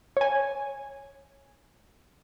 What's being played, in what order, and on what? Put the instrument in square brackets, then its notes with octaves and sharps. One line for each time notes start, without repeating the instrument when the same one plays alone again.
[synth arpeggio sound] C#5 G#5